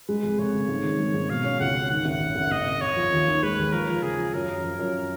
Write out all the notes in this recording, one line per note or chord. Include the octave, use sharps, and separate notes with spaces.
G#3 B4
F1
F1 C#5
C#3
G#2
D#3
G#2
G#2
B2 F5
C#4
C#2 F#5
C#4
D#3 F#5
F#1
F#1
F#1
F#1 D#5
F#1
F#1 C#5
F3
D#2
D#3
G#3 B4
D#2
F3 A#4
F3
C#3 G#4
F3
F#2 A#4
F#2
F3
F#2